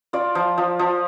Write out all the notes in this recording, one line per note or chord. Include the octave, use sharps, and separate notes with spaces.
F4 D5
F3
F3
F3